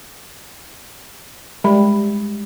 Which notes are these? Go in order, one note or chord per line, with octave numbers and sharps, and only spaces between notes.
G3 G#3 B5